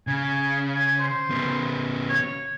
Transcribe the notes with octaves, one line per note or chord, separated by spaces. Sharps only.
C#3 G#5
G#5
C5
C#3 B3
C#5